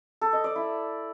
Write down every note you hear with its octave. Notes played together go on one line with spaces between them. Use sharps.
A4
D#5
D5
E4